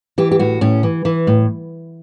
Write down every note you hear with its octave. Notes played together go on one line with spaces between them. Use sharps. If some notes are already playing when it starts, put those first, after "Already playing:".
E3 G4
G4
A2 F#4
A2 C#4
E3
E3
A2